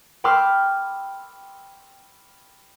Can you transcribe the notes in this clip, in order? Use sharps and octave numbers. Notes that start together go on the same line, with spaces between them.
G5 B5 C6 D6 E6 F6